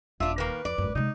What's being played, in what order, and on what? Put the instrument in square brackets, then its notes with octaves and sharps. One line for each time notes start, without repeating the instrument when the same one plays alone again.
[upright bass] D#1 [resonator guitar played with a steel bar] D4 F4 [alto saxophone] E5
[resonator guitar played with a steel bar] D#3 A#3 [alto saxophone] B4
[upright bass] F2 [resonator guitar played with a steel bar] D5
[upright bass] G#1 F#2
[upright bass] C3 G#3 [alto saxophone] D#4